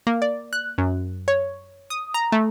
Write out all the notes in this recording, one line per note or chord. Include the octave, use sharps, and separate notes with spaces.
A#3
D5
F#6
F#2
C#5
D#6
A#5
A3